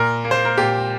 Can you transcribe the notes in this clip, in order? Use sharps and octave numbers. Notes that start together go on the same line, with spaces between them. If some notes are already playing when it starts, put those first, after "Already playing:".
Already playing: A#2 A#4
A#3
C5
A#4
A#2 G4